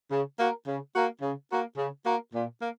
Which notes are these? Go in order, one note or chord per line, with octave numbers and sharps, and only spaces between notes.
C#3
A#3 F#4 A#4
C#3
A#3 F#4 A#4
C#3
A#3 F#4 A#4
C#3
A#3 F#4 A#4
A#2
A#3